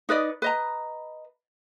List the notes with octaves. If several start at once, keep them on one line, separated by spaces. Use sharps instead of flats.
D#4 B4 D5 D#5
B4 D#5 A#5